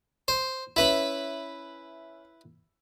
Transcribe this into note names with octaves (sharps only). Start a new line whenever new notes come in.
C5
C#4 E4 B4 E5 B5